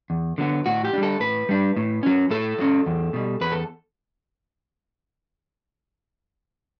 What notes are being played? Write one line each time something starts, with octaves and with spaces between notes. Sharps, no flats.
E2
D3 F#3 B3
A2 F#4
G4
G3 D4
A4
A2 B4
G3 D4
A2
F#3 C#4
A2 A4
F#3 C#4
E2
B2 G3
E2 B4
A4